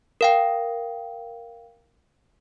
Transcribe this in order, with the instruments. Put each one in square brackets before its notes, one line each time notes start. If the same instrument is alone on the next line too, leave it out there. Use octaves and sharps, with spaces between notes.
[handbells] A#4 F5 G5